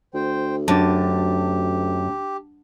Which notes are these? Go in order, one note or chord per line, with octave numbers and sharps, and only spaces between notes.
D2 C5 G5
F#2 D4 G4 A5